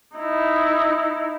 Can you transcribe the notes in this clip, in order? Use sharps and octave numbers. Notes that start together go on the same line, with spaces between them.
D#4 E4